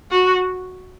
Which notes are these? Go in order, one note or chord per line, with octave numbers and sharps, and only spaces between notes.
F#4